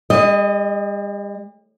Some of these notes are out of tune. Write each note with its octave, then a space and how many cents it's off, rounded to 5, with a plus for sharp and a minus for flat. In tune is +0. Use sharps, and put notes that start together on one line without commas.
G3 +45 D#5 +0